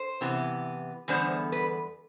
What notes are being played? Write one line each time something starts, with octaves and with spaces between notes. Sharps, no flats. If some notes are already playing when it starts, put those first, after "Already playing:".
Already playing: C5
C3 E3 B3
E2 D3 G3 B3 C5
B4